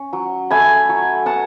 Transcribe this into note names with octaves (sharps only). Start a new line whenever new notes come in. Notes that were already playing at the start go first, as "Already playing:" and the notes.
Already playing: C#4
F#3
A3 G#5 B5
F#3
B3 F#5 A5